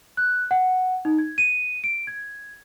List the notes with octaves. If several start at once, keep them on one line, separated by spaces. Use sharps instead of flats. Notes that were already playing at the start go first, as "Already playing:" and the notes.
F#6
F#5
D#4
G#6
D#7
D7
G#6